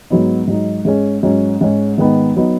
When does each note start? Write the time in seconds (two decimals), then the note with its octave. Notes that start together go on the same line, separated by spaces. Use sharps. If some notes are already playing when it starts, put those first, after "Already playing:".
0.10 G#2 F#3 B3 D#4
0.48 G#2 F#3 D#4
0.85 G#2 G#3 C#4
1.23 G#2 F#3 C#4
1.61 G#2 G#3 C#4
1.98 G#2 D#3 B3 D#4
2.36 F#3 B3 D#4